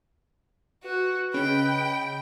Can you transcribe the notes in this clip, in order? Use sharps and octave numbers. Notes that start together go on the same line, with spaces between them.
F#4 B4
C#3 D#5 G5 B5